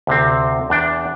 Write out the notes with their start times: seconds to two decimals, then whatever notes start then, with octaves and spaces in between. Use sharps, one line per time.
0.07 D2 C3 C4
0.70 E2 D4 G5